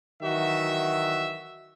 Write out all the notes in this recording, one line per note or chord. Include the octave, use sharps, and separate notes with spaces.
D#3 E3 F#3 F#4 E5